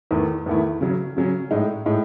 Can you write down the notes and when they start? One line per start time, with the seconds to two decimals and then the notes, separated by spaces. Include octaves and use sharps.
0.11 E2 D#3 A3 E4
0.46 E2 D#3 A3 E4
0.81 C#3 F#3 C#4
1.17 C#3 F#3 C#4
1.51 A2 G#3 D#4
1.86 A2 G#3 D#4